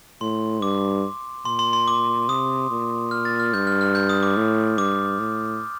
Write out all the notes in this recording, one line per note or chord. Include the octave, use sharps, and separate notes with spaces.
A2 C6
G2 D6
A#2 C6
C6
C6
D6
C3 D#6
A#2
F6
A6
F6
G2 G6
F6
F6
G6
D#6
D6
A2
G2 D6
A2